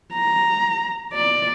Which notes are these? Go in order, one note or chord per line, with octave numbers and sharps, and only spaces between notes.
A#5
D5